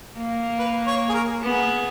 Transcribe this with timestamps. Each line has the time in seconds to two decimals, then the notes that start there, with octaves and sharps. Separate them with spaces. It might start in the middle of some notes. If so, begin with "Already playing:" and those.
0.17 A#3
0.59 B4
0.87 C#5
1.09 G#4
1.14 A#4
1.43 B3 G#4